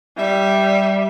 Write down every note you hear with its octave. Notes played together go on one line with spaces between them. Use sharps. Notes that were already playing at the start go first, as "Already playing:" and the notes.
G3 E5